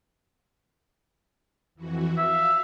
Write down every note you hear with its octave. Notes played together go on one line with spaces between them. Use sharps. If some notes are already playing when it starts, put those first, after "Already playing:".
F2 E3 F#4
E5 F5